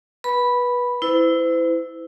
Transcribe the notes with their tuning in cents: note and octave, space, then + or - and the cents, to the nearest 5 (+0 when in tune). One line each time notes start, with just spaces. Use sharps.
B4 -20 B5 +0
E4 +0 C5 -45